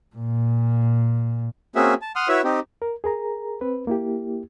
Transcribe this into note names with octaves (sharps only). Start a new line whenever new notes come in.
A#2
A#3 C4 C#4 F#4 G#4 E5
A5
F#5 C6 D#6 F6
E4 F#4 B4 C#5 E5
C4 D#4 G4
A#4
G#4 A#4 A#5
C4 B4
A#3 E4 G4